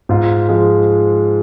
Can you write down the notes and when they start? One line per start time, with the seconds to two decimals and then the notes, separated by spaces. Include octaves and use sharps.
0.09 G#2 F4
0.49 F3 G#3